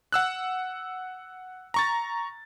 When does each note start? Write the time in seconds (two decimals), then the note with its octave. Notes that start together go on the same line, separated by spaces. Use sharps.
0.12 F#5 E6 F#6
1.74 A#5 C#6 A6